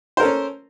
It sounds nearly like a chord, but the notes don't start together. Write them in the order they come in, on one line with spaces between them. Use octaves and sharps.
C5 A#4 A4 C#4